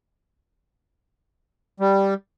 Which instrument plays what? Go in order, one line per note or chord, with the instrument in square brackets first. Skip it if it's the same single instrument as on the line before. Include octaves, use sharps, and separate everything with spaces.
[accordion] G3